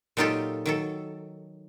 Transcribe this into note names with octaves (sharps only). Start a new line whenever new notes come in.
A#2 F#3 D#4 F4 G4 A4
D#3 F#3 A4